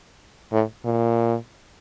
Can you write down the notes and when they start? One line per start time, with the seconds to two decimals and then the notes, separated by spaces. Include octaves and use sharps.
0.52 A2
0.85 A#2